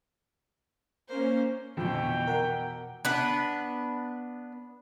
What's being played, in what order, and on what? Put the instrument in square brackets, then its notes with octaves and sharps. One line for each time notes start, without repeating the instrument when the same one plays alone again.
[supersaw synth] A#3 C#4 [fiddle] C5
[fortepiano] F2 D3 [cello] B2 E3 [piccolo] G5
[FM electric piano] F#4 A#4 F#5
[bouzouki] B3 D4 B4